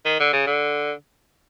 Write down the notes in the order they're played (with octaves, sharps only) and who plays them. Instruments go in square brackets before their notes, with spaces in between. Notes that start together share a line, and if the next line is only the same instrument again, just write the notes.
[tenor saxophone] D#3
D3
C#3
D3